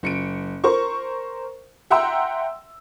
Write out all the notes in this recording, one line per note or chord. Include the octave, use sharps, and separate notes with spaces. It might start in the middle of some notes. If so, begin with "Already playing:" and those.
F#1 C#7 D7
A#4 C5 C#6
E5 F#5 G5 A#5 C6 E6